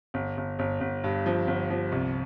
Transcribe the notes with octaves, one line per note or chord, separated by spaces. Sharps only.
G1
G1
G1
G1
G2
F3
G1
F3
C2